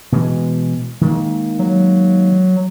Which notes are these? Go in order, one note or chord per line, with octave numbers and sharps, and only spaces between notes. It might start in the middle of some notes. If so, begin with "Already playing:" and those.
B2 E3 G#3
D#3 G#3 A#3
F#3